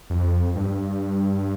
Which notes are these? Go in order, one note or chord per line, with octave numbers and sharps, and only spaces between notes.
F2
G2